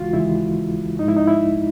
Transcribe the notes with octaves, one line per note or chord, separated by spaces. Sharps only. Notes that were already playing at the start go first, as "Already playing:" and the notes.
Already playing: D#2 C#3 E3 G#3 F4 F#4
D#2 C#3 E3 G#3 E4
G#2 F3 G#3 D#4
E4
D#4
E4